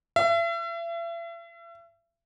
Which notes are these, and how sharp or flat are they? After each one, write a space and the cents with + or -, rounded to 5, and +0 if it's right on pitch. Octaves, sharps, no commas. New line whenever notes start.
E5 +40